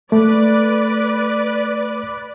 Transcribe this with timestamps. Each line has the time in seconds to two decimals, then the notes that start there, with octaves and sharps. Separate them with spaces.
0.12 A3 B4 D5